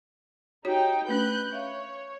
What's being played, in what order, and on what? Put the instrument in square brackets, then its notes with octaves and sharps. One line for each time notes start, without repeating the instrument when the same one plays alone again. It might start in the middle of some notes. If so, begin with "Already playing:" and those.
[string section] D#4 G5 [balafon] F#4 G4 C#5
[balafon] A3 C#4 D4 [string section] B4 F#6 G6
[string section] C#5 [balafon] E5 F5